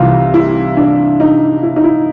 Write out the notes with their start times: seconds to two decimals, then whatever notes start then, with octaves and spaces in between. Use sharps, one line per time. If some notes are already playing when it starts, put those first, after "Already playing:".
Already playing: C2 C3 E3 F4
0.34 E4
0.77 D4
1.20 D#4
1.63 E4
1.76 D#4
1.84 E4